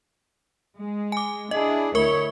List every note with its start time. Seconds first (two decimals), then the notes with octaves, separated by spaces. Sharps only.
0.76 G#3
1.12 G#5 D6
1.51 D4 E4 G#4 D#5
1.95 D2 E4 A#4 C#5 C#6 G7